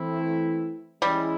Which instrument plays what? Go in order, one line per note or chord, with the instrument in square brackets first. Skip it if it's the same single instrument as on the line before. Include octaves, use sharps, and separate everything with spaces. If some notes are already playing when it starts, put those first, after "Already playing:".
Already playing: [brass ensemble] E3 A3 C4 E4
[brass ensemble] E3 G#3 C#4 E4 [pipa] G3